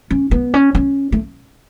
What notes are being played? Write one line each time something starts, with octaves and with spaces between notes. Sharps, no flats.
C#4
B3
C#4
C#4
A3